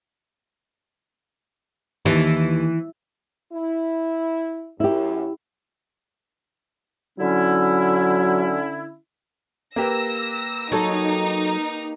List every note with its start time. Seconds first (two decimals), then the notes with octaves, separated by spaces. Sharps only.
2.06 D#2 E3 A5
3.53 E4
4.80 F#2 E4 G4
7.19 D3 F#3 C#4 E4
9.76 A#3 G4 B4 E6 A#6
10.72 F#3 D#4 A4